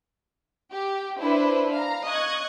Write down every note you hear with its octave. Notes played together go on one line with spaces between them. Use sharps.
G4
D4 E4 B4 C5
F5 A#5
D#5 C#6 F#6 G#6